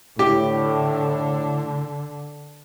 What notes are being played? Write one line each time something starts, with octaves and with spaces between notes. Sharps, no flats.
A2 D3 G4